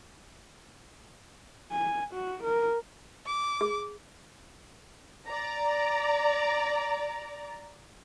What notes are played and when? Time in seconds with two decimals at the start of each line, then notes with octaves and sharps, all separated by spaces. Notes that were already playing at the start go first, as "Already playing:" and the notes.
1.72 G#5
2.14 F#4
2.43 A#4
3.27 D6
3.61 G#4
5.27 D5 A#5